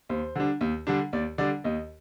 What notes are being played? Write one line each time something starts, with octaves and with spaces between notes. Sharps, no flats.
D#2 C5
D3 G3 D4
D#2
D3 G3 D4
D#2 D5
D3 G3 D4 D5
D#2 D#5